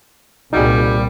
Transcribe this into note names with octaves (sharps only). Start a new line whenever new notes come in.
C2 A#2 G3 D#4 F#4 G#4